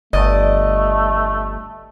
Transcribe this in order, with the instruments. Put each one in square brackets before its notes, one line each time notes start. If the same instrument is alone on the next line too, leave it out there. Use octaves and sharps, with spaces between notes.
[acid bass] G1 [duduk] A3 [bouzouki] D5 D#5